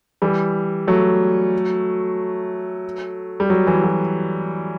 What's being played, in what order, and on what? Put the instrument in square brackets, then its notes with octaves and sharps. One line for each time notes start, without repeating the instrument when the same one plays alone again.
[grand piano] E3 G3
F#3 A3
G3
F#3
E3
F#3